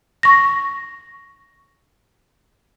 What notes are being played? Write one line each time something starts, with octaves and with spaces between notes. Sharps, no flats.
C#6 A#6